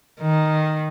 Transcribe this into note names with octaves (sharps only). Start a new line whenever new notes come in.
D#3